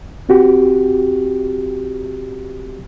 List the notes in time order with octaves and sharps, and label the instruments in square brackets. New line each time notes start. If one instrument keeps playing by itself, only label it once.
[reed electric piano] C4 F#4 G4